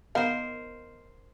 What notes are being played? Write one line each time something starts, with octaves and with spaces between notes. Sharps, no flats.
B3 D#4 A#4 C5 F5